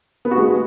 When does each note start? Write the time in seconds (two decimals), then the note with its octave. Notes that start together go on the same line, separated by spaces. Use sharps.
0.25 B3
0.31 F#4
0.38 G#3